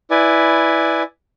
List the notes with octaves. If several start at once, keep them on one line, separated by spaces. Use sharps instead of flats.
E4 B4 D5 G#5